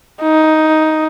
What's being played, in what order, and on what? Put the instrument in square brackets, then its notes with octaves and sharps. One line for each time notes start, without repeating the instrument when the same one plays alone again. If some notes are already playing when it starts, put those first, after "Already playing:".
[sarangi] D#4